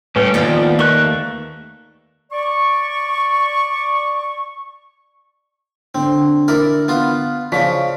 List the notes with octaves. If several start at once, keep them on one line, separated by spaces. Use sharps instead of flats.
A2 G3 A3 C#4 B4
D#2 F3 A3 B3 F4 D5 G5
A3 A#4 C#6 F#6
D5 C#6
D3 C4
E4 A#4 D5
B3 F4
C#3 F3 D5 C#6 B6